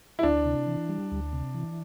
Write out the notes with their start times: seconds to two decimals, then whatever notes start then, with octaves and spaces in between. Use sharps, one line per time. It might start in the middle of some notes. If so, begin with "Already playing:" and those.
0.19 E4
0.23 D2 D4
0.45 C3
0.67 E3
0.89 G3
1.12 D2
1.33 C3
1.54 E3